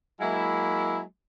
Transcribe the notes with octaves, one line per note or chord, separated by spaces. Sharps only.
F#3 G#3 A#3 E4